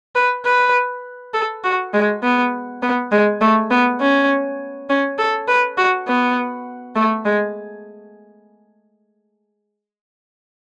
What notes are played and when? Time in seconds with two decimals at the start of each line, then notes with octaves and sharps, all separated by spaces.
0.15 B4
0.45 B4
1.34 A4
1.64 F#4
1.94 G#3
2.23 B3
2.83 B3
3.12 G#3
3.41 A3
3.71 B3
4.01 C#4
4.89 C#4
5.19 A4
5.48 B4
5.78 F#4
6.08 B3
6.96 A3
7.25 G#3